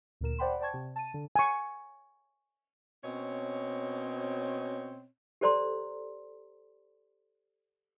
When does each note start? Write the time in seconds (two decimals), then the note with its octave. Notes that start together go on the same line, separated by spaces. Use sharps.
0.21 D2 A#2 A#4 E7
0.38 C5 D5 F#5 G5 B5 C6
0.60 C5 D5 G5 A5 C#6 G#6
0.74 C3
0.96 A5 D#7
1.14 D3
1.36 G#5 C#6
3.04 B2 C4 C#4 C#5 D#5
5.41 G4 A4 C5 D5 A#5 C6